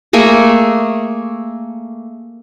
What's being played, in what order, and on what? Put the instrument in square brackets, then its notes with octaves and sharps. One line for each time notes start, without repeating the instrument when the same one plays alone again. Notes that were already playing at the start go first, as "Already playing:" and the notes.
[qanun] A3 A#3 G#4